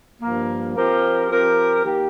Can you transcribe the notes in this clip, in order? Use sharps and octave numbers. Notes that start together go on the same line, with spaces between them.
G2 F3 A#3
F3 C4 G4 A#4
F3 C4 G4 A#4
D#3 A#3 G4